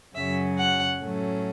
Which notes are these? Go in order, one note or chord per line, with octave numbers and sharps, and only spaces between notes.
F#2 C#3 F#3 C#4 E5
F#5
A2 F#3 A3 C#4